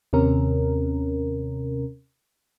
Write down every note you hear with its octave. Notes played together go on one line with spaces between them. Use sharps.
D#2 C3 C#4 A#4